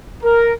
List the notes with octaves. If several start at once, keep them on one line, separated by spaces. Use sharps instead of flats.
A#4